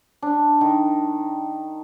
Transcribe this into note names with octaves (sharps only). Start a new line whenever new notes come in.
D4
D#3